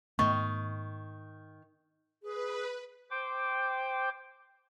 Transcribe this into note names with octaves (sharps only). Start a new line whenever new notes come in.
G#2 D#3 A3 B3 C#6
G#4 B4
C5 G5 D6